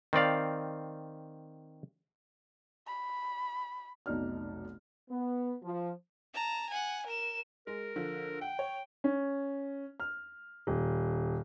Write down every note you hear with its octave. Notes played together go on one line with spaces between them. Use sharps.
D#3 C4 D5 F5
B5
F1 B1 B2 D#4 D5 F6
B3
F3
A5 A#5
F#5 G#5
A#4 E7
G#3 A#4
D3 F3
F#5 G5
C#5
C#4
F6
D#1